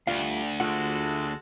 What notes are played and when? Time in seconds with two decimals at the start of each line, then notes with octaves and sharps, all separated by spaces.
0.07 D2 G3 F4 F5
0.60 G#3 A3 F4 F#4 A4 F#5